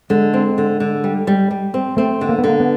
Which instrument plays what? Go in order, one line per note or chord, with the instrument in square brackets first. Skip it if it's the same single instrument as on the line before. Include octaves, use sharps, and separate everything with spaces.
[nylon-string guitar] D3 [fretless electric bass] G#3
[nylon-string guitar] C4
D3
D3
G3
G3
G3
C4
[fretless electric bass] A3 [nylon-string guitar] C4
[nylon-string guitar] D3
[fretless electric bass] A#3
B3
[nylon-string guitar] D3 [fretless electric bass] A#3
[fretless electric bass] B3